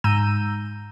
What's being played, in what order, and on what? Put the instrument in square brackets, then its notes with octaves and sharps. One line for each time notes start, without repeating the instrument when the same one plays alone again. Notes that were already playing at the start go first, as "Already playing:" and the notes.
[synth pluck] G#2 A#5 E6 G6 D#7